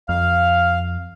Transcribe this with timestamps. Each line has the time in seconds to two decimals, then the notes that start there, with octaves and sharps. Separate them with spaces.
0.09 F2 F5 F6